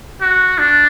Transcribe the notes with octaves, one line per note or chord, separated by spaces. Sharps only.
F#4
D4